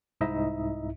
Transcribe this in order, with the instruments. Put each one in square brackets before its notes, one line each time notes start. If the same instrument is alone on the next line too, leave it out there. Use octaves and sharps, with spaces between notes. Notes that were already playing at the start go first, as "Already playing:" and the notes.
[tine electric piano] C2 G#2 D#4 E4 D#5 E5